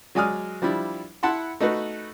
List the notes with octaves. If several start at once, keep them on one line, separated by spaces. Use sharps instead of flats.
F#3 G#3 D5 G#5 D#6 F6
F3 G3 D4 E4
E4 F#5 A5 B5 C6
A3 D#4 F#4 B4